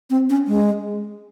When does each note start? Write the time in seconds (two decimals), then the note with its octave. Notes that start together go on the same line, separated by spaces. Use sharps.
0.10 C4
0.30 C#4
0.48 G#3